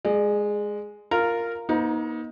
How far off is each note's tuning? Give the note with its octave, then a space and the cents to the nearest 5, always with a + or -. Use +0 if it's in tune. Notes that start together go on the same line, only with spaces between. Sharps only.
G#3 +0 D5 +45
F4 +0 A#4 -10
A#3 +45 D#4 +15 C5 -40